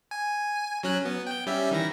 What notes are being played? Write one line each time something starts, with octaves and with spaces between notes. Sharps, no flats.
G#5
F#3 C#4 F#6
B3
G5 G6
G3 C#4 E5
D#3 E3 A#6